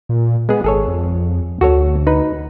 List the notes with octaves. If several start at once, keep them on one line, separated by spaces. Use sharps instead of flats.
A#2
G#3 B3 G#4
G#1 G#4 A4 C#5
F2
D2 F#4 A4 C#5
D#4 B4